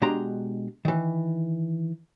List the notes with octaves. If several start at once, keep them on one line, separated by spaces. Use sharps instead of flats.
B2 G#3 D4 G4 A#5 C6
D#3 E3